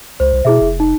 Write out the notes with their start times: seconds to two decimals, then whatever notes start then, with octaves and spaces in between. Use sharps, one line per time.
0.20 C#2 C5
0.33 C2
0.45 B2 E4 G#4 E5
0.61 F1
0.80 D#4